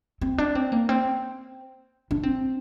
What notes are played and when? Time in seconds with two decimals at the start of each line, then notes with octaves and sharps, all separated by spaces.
0.21 C4
0.38 D4
0.55 C4
0.72 A#3
0.89 C4
2.11 D4
2.23 C4